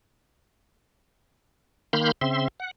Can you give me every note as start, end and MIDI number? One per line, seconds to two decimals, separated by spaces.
1.93 2.12 51
1.93 2.12 58
1.93 2.12 83
1.93 2.12 84
1.93 2.12 89
1.93 2.12 91
2.21 2.48 49
2.21 2.48 60
2.21 2.48 76
2.21 2.48 84
2.60 2.71 78